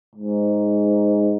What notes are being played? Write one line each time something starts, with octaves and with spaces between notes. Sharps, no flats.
G#2